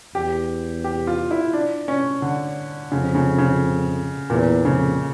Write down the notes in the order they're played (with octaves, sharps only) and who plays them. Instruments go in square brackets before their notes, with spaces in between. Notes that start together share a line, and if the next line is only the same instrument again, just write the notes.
[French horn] E2 [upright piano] G4
[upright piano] G4
F4
E4
D4
C#4
D3
[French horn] F2 [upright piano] C#3
[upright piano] C#3
C#3
[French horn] E2 [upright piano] A#2
[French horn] F2 [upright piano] C#3